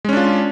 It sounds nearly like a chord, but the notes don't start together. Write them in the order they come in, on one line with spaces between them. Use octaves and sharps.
G#3 C#4 D4 F4